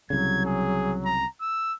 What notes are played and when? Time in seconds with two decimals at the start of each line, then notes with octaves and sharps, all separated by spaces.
0.10 C2 C#3 F#3 G#6
0.46 G#4
1.05 A#5
1.41 E6